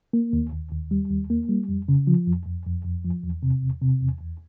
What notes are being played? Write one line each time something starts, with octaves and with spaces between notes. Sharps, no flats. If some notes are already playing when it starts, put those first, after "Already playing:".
A#3
D#2
D#2
D#2
G3
D#2
A#3
G3
F2
C#3
F3
F2
F2
F2
F2
F3
E2
C3
E2
C3
E2
E2